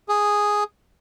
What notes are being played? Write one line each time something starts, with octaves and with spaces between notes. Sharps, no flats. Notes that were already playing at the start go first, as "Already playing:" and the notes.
G#4